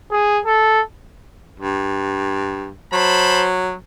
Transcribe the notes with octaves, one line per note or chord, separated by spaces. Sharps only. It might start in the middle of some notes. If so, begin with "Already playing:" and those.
G#4
A4
G2
F#3 C5 A5 B5